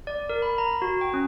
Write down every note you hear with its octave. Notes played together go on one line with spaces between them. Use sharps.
D5
A#4
B5
A#5
F#4
G5
C#4